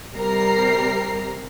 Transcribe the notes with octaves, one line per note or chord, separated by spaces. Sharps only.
C3 G3 G4 A#4 A#5 C7